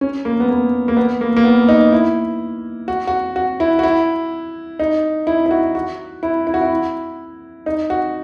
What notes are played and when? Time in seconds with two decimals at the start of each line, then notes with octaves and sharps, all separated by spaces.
0.01 C#4
0.25 A#3
0.40 B3
0.49 A#3
0.88 A#3
0.97 B3
1.21 A#3
1.37 A#3
1.44 B3
1.69 D#4
1.93 E4
2.88 F#4
3.07 F#4
3.36 F#4
3.60 E4
3.79 F#4
3.83 E4
4.79 D#4
5.27 E4
5.46 E4
5.51 F#4
5.75 F#4
6.23 E4
6.47 E4
6.54 F#4
6.61 E4
7.66 D#4
7.90 F#4